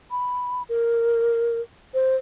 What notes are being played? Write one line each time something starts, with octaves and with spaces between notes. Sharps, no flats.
B5
A#4
C5